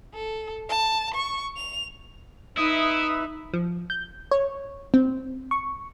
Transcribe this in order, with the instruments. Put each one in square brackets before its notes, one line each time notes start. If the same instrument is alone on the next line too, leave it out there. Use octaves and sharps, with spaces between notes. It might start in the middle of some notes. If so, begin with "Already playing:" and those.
[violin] A4
A5
C#6
F7
[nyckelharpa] D#4 [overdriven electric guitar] E4 [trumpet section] B4 E5 [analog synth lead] D#6
[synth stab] F3
G6
C#5
C4
C#6